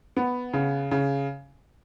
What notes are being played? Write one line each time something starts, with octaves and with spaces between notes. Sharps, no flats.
B3
C#3
C#3